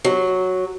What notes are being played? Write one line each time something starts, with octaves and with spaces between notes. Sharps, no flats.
F#3